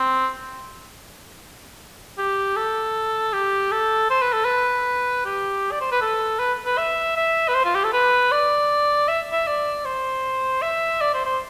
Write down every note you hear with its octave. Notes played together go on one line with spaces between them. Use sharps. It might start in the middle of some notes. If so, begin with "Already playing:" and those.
Already playing: C4
G4
A4
G4
A4
C5
B4
A4
B4
G4
D5
C5
B4
A4
B4
B4
E5
E5
B4
C5
F4
G4
A4
B4
D5
E5
E5
D5
C5
E5
D5
C5
C5